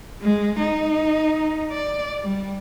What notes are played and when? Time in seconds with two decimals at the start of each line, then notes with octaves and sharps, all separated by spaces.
0.22 G#3
0.59 D#4
1.72 D5
2.23 G3